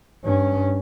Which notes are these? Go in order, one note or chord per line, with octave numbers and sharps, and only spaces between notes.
G2 C#4